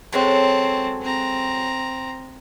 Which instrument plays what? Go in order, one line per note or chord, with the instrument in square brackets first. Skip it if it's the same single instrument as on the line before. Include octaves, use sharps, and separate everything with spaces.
[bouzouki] F#3 G#3 C#4 [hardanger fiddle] C4 A4
[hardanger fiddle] C4 A#5